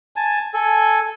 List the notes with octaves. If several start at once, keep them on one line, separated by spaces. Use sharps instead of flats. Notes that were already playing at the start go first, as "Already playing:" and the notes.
G#5 A5
A4 G#5